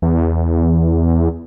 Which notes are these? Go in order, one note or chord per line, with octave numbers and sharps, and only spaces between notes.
E2